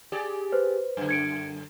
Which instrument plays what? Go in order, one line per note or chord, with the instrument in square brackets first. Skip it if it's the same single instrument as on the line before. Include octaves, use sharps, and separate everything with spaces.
[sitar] G4 G#4 D5
[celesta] B4 C5
[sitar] F#2 D3
[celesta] G#6 C#7 D7